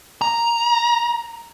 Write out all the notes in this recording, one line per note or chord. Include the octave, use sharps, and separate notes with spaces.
A#5